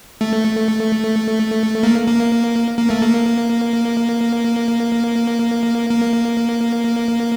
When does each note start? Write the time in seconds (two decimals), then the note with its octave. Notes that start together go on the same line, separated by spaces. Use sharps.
0.21 A3
1.83 A#3
2.08 A#3
2.77 A#3
2.90 A3
3.02 A#3
5.89 A#3